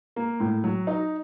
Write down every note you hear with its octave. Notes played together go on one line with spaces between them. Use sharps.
A#3
A2
F#3
D#4